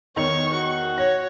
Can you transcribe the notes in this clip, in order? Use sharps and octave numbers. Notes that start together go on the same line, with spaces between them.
E2 D#3 C#5 C#6 F7
F#4
C#5 A#6